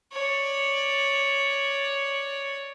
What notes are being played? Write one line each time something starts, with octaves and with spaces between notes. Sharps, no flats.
C#5 D5